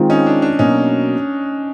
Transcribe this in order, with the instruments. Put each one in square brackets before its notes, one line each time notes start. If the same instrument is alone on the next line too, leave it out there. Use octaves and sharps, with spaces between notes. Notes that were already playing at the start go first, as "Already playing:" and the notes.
Already playing: [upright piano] D#3 G#3 C4 F4
[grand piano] C#4 D#4
D4
D4
[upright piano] B2 F#3 A#3 [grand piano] C#4 D#4